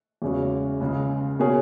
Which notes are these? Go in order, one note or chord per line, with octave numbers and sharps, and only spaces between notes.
E2 C#3 G#3 C#4 F#4
C#2 C#3 G#3
B2 A#3 C#4 G#4